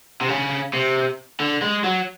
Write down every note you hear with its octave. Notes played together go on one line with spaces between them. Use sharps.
C3
C#3
C3
D3
G#3
F#3